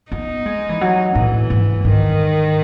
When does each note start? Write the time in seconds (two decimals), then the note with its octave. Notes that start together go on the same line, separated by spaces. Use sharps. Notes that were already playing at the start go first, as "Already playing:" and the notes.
0.12 B3 D#4
0.46 G#3
0.69 E3
0.81 F#3
1.15 A2 E3
1.50 G#2
1.85 G#2 D#3